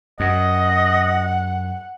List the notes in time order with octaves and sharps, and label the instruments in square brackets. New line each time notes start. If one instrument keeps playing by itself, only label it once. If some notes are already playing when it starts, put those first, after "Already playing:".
[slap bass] F#2 [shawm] D#5 [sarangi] F#5